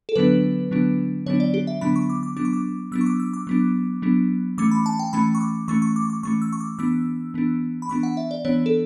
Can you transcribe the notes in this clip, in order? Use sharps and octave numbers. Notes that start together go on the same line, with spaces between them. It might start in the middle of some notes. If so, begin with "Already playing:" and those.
A4
D3 F#3 B3 D4 B4
D3 F#3 B3 D4
D3 F#3 B3 D4 C#5
D5
G4
E5
D3 F#3 B3 D4 B5
C#6
D6
D6
F#3 B3 D4 D6
C#6
D6
F#3 B3 D4 E6
C#6
D6
E6
D6
F#3 B3 D4
F#3 B3 D4
E3 A3 C#4 D6
B5
A5
G5
E3 A3 C#4 B5
C#6
D6
E3 A3 C#4 C#6
C#6
D6
C#6
D6
E3 A3 C#4 C#6
E6
C#6
D6
E3 B3 D4 E6
E3 B3 D4
B5
E3 B3 D4 C#6
F#5
E5
D5
E3 B3 D4 C#5
A4